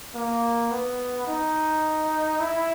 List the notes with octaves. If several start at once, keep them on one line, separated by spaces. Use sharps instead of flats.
A#3
B3
D#4
E4